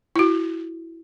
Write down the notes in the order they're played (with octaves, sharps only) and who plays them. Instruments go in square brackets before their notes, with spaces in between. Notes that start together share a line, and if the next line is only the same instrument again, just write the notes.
[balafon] E4 F#4